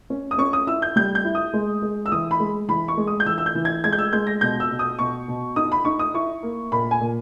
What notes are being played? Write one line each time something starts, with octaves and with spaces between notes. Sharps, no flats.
C#4
D#6
C#4 C#6
D#6
E4 E6
G6
G3 G6
G6
E4
D#6
G#3
G#3
E6
E3 D#6
B5
G#3
E3 B5
C#6
G#3
D#6
G6
E3 E6
E6
G6
E3
G#6
G#3 G#6
G6
E6
G#3 G6
A#6
B2 G6
E6
B2
D#6
B2 C#6
B2
D#4 D#6
B5
D#4 C#6
D#6
E4 C#6
A#3
A#2 B5
G#5
A#2